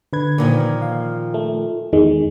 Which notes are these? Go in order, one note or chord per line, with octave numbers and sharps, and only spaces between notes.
D3 B4 G#6
A#2 D#3 F3
F5
A3
E2 D#3 G#3